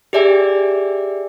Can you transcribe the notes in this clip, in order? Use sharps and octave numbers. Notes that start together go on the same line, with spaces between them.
G4 G#4 D5 E5 G#5